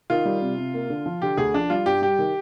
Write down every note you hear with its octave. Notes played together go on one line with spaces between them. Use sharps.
D#3 F4
G3
C3
C3
A#3
D3
F3
D3 G4
D2 G#4
F3 D4
G3 F4
G2 G4
G3 G4
D#3